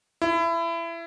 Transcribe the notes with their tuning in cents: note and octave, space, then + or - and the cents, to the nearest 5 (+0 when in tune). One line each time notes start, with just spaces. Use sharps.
E4 +25